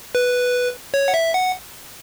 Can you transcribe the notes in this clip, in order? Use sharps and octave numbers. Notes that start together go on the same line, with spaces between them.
B4
C#5
F#5
E5
F#5